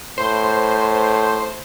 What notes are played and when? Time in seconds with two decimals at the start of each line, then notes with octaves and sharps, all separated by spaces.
0.18 A2 C5